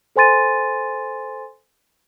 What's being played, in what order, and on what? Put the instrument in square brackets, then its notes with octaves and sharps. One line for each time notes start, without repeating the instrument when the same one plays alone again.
[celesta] A4 C5 G#5 C6 A6 D#7